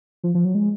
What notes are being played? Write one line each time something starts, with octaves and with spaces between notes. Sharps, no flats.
F3
F3
F#3
G#3